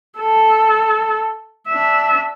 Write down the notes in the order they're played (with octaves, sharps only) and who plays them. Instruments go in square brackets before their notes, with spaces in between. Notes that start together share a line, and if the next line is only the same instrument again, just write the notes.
[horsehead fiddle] A4
D4 E5